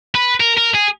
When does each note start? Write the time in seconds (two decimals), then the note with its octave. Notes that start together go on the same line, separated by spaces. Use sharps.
0.15 B4
0.40 A#4
0.58 A#4
0.75 G#4